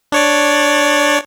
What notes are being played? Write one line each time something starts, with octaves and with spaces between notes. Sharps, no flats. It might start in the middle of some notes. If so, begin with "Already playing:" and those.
D4 C#5 D5